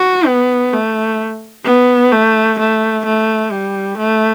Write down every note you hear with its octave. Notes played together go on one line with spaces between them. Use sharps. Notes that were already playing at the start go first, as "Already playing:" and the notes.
Already playing: F#4
B3
A3
B3
A3
A3
A3
G3
A3